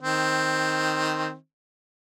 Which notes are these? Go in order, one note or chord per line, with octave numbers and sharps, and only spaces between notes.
D#3 C4